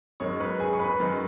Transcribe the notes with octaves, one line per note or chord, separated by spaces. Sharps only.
F#2 D#3 G#3 C#5 C#6
B4 B5
G#4 G#5
C#6
B4 B5
F#2 D#3 G#3